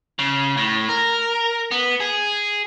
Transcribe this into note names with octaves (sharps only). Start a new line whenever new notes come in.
C#3
A2
A#4
B3
G#4